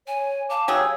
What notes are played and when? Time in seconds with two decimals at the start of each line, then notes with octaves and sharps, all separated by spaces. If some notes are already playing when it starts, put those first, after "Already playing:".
0.07 C#5 G#5
0.50 F5 A5 D6
0.68 F#3 G4 G#4 C#5 E6